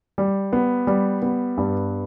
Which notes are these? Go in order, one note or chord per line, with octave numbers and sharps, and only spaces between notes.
G3
B3
G3
B3
G2